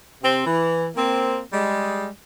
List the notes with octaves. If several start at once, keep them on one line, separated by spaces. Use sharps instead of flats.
C3 C4
E3
A#3 C4
G3 G#3